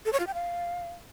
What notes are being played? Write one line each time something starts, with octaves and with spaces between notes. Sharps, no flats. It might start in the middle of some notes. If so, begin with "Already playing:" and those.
A4
C#5
F4
G5
F5